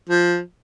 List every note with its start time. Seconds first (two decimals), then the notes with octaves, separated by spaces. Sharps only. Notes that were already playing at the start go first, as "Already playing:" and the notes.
0.09 F3